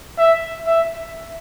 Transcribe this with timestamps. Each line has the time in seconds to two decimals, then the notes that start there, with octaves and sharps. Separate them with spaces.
0.18 E5
0.67 E5